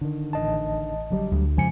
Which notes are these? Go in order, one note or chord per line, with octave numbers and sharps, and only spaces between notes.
D3 D#3
A1 D#5 A5
D3 F#3 G3
D2
F2 C#3 F3 G#3 G#5 C#7